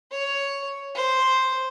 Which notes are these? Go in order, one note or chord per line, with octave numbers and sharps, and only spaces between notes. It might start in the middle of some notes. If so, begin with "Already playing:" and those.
C#5
C5